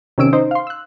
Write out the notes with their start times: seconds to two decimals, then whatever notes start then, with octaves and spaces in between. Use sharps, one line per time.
0.18 C3 D#3 C#4 E6 D7
0.33 D#4 C5
0.51 F5 C6
0.67 E6 F#6